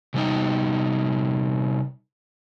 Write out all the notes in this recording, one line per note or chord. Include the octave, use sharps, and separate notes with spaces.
C3 G3 D#4